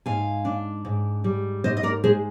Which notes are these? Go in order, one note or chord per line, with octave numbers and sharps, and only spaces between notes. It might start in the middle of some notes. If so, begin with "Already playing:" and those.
G#2 F5 G#5
D4
G#2
G3
G#2 C5 D#5
D#5
A#4 D5
G#3 G#4 C5